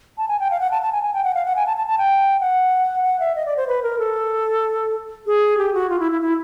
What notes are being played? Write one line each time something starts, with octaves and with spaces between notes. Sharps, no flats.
A5
G#5
G5
F5
F#5
A5
A5
G#5
G#5
G5
F#5
F5
F#5
G#5
A5
A5
A5
G5
F#5
F#5
E5
D#5
D5
C5
B4
A#4
A4
G#4
G4
F#4
F4
E4
E4
E4